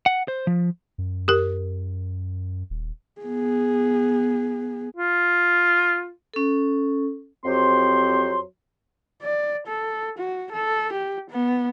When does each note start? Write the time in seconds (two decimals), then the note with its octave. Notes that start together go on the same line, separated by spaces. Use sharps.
0.06 F#5
0.28 C5
0.47 F3
0.98 F#2
1.28 G4 A#4
2.70 D#1
3.22 B3 G#4
4.96 F4
6.34 C#4 A4
7.44 F2 F#3 C4 G4 C5 C6
9.23 D5
9.67 A4
10.18 F#4
10.52 A4
10.93 G4
11.30 B3